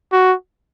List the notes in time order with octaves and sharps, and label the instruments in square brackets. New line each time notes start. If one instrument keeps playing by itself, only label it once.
[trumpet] F#4